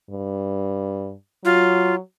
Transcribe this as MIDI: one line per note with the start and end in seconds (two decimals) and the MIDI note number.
0.10 1.14 43
1.45 1.99 54
1.45 1.95 65